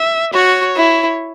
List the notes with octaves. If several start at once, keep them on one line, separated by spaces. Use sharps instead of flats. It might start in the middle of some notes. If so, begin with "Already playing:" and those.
Already playing: E5
F#4 C#5
E4